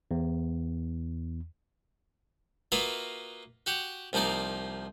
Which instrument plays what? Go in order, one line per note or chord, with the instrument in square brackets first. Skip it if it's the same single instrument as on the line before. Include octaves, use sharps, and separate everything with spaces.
[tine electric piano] E2
[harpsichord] A#3 F4 F#4 B4 D#5 E5
F#4 G4 F#5
C2 F3 A#3 D#4 D5